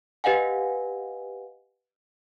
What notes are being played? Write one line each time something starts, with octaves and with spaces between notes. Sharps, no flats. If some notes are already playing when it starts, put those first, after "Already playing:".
G4 B4 D#5 F5 F#5 G#5